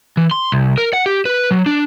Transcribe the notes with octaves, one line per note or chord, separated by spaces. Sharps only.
E3
C6
C2
A#4
F#5
G4
B4
F#3
D4